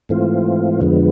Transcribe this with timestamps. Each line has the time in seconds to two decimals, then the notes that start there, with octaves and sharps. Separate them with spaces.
0.09 G#2 E3 A3 C4 F4
0.81 F2 D3 F3 G#3 B3